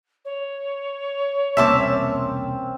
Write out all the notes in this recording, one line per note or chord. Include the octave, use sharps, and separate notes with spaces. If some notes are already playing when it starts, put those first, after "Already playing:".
C#5
E1 C2 A#3 C4 C#4 E5 A5 D6